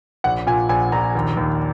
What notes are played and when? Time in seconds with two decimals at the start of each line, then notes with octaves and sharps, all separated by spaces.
0.24 A#1 F#5
0.47 A#2 G#5
0.69 A#1 G#5
0.92 A#1 A#5
1.15 D#2
1.37 D#2